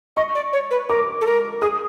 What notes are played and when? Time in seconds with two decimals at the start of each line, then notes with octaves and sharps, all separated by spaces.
0.16 D#5 C#6
0.35 D5
0.53 C#5
0.71 B4
0.89 A#4 D6
1.21 A4
1.26 A#4
1.61 G#4 D#6